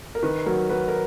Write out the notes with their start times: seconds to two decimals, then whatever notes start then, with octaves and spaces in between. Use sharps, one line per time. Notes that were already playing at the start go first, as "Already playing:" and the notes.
0.15 A#4
0.22 D#3 B4
0.46 F#3 A#4
0.70 F#3 B4
0.88 A#4